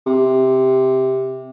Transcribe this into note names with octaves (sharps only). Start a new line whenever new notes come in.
C3